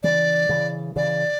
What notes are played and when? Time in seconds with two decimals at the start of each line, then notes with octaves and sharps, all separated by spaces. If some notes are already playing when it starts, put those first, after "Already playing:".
0.03 C#3 E3 D5
0.49 C#3 E3
0.96 C#3 E3 D5